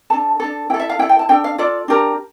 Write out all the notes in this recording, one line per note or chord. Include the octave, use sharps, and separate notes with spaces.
D4 A4 A5
D4 A4
E4 A4 G5
E5
F5
E4 A4 G5
G5
A5
D4 A4 G5
F5
F4 A4 D5
D4 G4 A#4